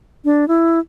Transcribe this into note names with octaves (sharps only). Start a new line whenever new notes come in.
D4
E4